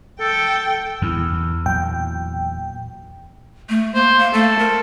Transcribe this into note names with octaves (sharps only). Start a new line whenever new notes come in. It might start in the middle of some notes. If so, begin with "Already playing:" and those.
A4 G5
E2 E3
A#2 F#3 G5
A3
A#3 C5
F5
A3 A4
A#4